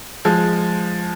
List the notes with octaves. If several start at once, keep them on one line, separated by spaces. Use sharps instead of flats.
F3 G#3